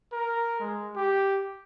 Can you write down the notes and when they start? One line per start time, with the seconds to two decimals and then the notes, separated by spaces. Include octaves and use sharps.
0.12 A#4
0.60 G#3
0.96 G4